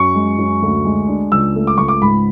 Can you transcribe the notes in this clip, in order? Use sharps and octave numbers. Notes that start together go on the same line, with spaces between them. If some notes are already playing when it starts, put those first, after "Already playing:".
Already playing: F#2 C#6
G#3
F#2
D2
G#3
D4
C#2 E6
A3
D6
C#2 C#6
D6
G#2 B5